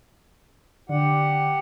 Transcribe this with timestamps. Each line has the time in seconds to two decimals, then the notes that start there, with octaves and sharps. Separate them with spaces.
0.89 D3 G4 F#5